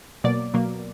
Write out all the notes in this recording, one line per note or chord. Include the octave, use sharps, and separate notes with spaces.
B2 F#3 A#3 D5
B2 F#3 A#3